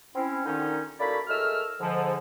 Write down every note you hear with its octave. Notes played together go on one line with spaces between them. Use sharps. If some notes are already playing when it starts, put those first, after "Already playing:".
C4 C#4 E4
A#2 D3 D#3 C#4 D#4
A2 A#3 F#4 D5 E5 B5
A2 G#3 A#4 E6 F6
G#2 D3 F3